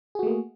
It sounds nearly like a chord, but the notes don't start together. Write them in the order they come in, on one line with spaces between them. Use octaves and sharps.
G#4 F#4 A3 A#3